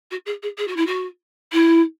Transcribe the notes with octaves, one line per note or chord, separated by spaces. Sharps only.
F#4
G#4
G#4
G#4
F#4
E4
F#4
E4